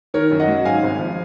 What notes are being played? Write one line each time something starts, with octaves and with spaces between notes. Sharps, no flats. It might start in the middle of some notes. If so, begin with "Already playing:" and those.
D#3 A#4 C#5
F#2
D#5 F#5
F#3
G#2 F5 G#5
G#1
F3